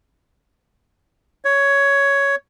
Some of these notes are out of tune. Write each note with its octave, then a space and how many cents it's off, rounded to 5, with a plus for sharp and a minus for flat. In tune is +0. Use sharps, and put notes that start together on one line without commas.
C#5 +10